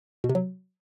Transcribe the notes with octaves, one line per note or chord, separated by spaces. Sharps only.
B2
C3
F#3